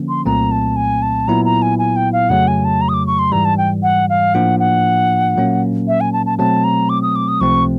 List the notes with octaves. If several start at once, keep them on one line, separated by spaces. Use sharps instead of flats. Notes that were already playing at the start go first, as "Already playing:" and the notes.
Already playing: D3 F3 A#3 C#4
C6
C2 A#2 F#3 A3 C4 A#5
A5
G#5
A5
A#2 F#3 B3 E4 A#5
A#5
G#5
G#5
G5
F5
F2 C#3 F#3 A3 F#5
G#5
A5
A#5
D#6
D6
C#6
C6
G#2 E3 G3 A#5
A5
G5
F#5
F5
A2 F3 A#3 D4 F4 F#5
F#5
A#2 F#3 A#3 C#4
E5
G#5
A5
A5
B2 F#3 A3 C4 A5
A#5
D6
D#6
D6
D#6
C#2 C3 F3 A3 C4 C#6